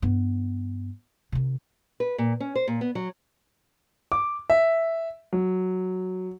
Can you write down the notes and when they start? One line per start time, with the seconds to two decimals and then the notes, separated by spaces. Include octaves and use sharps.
0.02 G2 B3
1.32 C3 D#3
2.00 B4
2.18 A#2
2.40 C#4
2.55 C5
2.68 A#2
2.81 B3
2.95 F#3
4.12 D6
4.50 E5
5.33 F#3